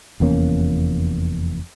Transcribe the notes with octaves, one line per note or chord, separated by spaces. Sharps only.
F1 E2 A#3 C#4